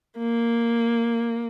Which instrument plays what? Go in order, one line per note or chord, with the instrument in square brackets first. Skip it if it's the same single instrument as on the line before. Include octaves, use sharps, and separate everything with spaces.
[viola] A#3